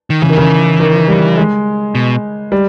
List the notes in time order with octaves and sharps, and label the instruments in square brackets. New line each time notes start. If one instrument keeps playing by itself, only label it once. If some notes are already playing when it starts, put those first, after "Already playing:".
[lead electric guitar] D#3
[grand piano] C#3 [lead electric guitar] E3
[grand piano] D#3
C#3
D#3
G3
G#3
[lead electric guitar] B2
[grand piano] G3